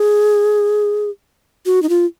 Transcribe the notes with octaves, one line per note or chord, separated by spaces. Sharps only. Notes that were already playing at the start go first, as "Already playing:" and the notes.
Already playing: G#4
F#4
D#4
F4